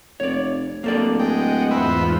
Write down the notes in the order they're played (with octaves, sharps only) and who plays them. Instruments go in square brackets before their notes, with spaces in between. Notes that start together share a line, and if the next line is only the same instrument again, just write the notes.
[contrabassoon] F1 [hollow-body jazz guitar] C#5 D5
[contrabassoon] D1 [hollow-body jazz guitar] A#3 A4 D5
[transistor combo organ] G#3 G5 [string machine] D#5 F#5
[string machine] E2 G#2 F4 [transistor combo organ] B4 C5 E5